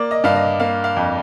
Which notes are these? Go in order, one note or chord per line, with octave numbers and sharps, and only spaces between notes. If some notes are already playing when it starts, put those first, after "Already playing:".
Already playing: A#3 D5
D#5
G2 F5
D#5
A#3 F5
F5
F2